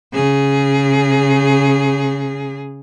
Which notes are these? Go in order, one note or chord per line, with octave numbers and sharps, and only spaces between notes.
C#3 G#4